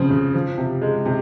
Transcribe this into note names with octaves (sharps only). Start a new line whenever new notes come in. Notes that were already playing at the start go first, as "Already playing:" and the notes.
Already playing: C#3 F3 C4
C#3
F3
C3
G#3
C3